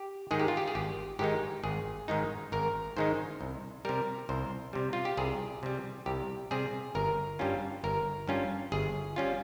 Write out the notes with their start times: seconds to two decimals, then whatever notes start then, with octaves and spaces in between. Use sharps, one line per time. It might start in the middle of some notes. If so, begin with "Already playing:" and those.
Already playing: G4
0.31 G#2 D#3 G#3 D#4 G#4
0.40 G4
0.48 F4
0.57 G4
0.68 G#4
0.75 G#1 G4
1.19 G#2 D#3 G#3 D#4 G4
1.64 G#1 G#4
2.08 G#2 D#3 G#3 D#4
2.52 G#1 A#4
2.97 G#2 D#3 G#3 D#4 C5
3.41 C2
3.85 C3 G3 A#4
4.29 C2 C5
4.73 C3 G3
4.93 F4
5.05 G4
5.17 C2 G#4
5.63 C3 G3
6.06 C2 G4
6.51 C3 G3 G#4
6.95 G1 A#4
7.39 G2 G3 C#4 F4
7.84 G1 A#4
8.28 G2 G3 C#4 F4
8.72 G1 G#4
9.16 G3 C#4 F4